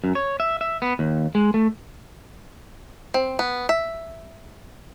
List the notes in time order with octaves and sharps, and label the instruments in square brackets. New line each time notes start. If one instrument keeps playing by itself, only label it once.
[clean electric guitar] F#2
C#5
E5
E5
B3
D#2
G#3
A3
[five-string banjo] C4
B3
E5